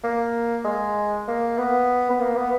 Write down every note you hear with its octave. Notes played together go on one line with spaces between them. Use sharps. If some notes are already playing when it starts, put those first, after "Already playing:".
A#3
G#3
A#3
B3
B3
A#3
B3